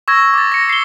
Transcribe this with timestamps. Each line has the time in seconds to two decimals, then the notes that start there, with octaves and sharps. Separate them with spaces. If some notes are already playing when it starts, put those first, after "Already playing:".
0.08 C#6 E6 G#6 A#6
0.34 D6 A6
0.52 A#6 C#7
0.69 C7 G7